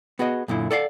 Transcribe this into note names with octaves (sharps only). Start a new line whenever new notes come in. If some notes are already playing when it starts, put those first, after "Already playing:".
B3 F#4 G#4 D#5
F#2 A#2 D3 E4
A4 D5 D#5 F5 F#5